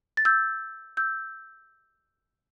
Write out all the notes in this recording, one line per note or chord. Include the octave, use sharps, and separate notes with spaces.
A6
E6 G6
E6 G6